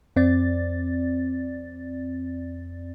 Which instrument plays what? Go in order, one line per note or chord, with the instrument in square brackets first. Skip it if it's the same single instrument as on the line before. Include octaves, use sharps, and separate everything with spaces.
[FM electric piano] F2 C4 D5 A6